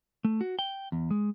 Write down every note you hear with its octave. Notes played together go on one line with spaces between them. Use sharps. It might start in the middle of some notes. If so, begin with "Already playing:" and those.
A3
F#4
G5
E2
G#3